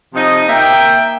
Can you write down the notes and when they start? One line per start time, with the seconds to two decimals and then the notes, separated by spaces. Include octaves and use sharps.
0.14 C3 F3 D#4 D#5
0.49 A#3 A#4 E5 G5